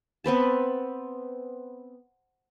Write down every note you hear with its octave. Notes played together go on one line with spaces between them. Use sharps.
B3 C4 B4 A5